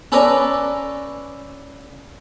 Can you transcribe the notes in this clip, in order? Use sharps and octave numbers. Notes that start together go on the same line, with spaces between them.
C#4 A4 B4 C#5 D5 A#5